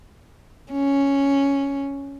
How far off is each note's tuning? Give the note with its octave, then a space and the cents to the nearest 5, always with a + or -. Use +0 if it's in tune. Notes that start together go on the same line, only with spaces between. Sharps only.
C#4 +0